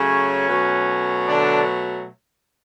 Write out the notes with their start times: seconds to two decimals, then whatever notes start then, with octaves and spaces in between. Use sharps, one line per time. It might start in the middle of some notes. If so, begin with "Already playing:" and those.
Already playing: C#3 F#3 A3 C#4
0.48 B2 F#3 A3
1.27 D3 D4